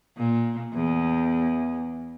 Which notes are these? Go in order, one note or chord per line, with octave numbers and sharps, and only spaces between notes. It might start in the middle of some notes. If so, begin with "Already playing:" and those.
A#2
E2